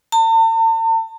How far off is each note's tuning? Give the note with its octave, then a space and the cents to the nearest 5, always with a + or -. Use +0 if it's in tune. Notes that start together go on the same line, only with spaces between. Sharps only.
A5 +45